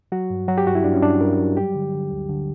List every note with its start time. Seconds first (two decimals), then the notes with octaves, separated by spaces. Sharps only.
0.12 F#3 F#4
0.30 G2
0.48 F#3 F#4
0.58 G4
0.67 G2 F#4
0.75 E4
0.84 G2 D4
0.94 C#4
1.02 G2 D4
1.21 G2 A#4
1.39 F#3
1.57 G3 G4
1.75 D3
1.93 D3
2.11 D2
2.29 D3